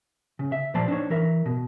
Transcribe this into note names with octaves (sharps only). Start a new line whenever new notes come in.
C#3
E5
A#2 F3 A#3 C5 D5 A5
D4 D#4 C5 C#5
E3 A#4 E5
B2